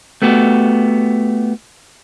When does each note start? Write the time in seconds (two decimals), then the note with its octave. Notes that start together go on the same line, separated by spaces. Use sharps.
0.22 A3 B3 F#4 G4